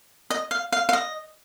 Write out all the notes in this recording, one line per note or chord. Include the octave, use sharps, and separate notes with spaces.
D#5
F5
F5
F5
D#5